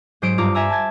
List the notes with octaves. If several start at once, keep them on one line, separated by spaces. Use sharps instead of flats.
G#2 F#3 C5 D#6 D7
G2 F4 A#5 D6
E5 G#5 A#5 E6
A5 G#6